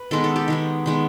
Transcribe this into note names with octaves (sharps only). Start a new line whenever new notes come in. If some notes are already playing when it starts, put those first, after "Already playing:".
Already playing: B4
D#3 G#3 B3 A4
A4
G4
D#3 G#3 B3
D#3 G#3 B3